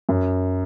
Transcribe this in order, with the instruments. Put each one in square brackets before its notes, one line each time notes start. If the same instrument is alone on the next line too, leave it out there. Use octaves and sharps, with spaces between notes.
[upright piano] F#2